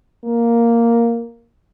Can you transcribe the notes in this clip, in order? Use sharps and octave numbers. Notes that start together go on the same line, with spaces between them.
A#3